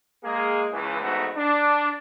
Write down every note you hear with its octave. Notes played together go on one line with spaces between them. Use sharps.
G#3 A#3 G#4
C#2 E3
G#1 E2 G#2 A3 B3 F#4
D4